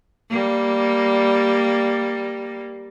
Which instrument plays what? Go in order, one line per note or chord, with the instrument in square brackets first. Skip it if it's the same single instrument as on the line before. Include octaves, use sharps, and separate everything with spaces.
[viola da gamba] G3 A#3